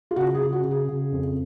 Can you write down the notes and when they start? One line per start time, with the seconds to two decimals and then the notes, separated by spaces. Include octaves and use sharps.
0.11 F4
0.16 C#3 F#4
0.34 G#4
0.40 C#3
0.53 F#4
0.64 C#3
0.71 G#4
0.88 C#3
1.12 F2